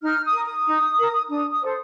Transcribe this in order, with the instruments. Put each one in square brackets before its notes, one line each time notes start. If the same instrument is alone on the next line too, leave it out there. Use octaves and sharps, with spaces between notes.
[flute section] D#4 F6
D#6
A#4
D#6
D#4
A#4
D4 D#6
D#6
A4 C5